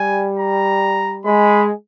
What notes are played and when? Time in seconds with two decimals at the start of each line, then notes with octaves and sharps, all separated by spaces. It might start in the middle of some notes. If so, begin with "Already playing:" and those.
Already playing: G3 G#5
0.39 A#5
1.25 G#3 B5